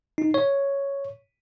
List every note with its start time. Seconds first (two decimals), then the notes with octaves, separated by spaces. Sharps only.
0.18 D#4
0.34 C#5